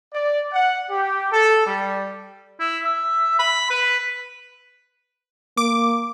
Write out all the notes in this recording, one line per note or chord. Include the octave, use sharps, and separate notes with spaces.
D5
F#5
G4
A4
G3
E4
E5
B5
B4
A#3 D6